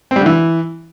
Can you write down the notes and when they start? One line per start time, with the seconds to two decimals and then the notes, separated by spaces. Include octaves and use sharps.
0.11 C4
0.16 G3
0.21 D3
0.26 E3